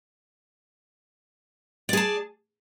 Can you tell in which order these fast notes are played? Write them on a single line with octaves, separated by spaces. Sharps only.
D5 G#4 A5